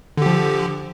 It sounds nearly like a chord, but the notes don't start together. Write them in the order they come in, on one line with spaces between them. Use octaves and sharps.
D3 G4 F3